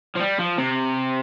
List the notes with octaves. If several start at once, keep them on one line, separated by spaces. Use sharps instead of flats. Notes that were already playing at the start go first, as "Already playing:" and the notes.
F3
G3
F3
C3